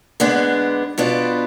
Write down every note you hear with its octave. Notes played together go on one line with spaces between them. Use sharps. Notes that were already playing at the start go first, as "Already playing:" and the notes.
D3 G#3 B3 D4
B2 B3 D4 F4